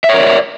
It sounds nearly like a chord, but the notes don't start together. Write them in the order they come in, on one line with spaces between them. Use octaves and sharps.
E5 C#5 A#4 D5